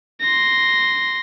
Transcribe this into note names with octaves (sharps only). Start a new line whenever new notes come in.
C6 A#6